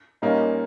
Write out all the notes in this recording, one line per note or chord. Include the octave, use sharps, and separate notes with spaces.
A#2 G3 A#3 C#4 D#4